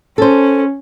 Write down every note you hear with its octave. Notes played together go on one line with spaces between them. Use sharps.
C#4 A4 C5